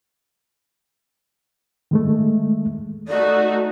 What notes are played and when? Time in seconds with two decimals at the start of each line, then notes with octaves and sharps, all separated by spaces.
1.91 D#3 G#3 A3
3.08 A3 D#4 F#4 D5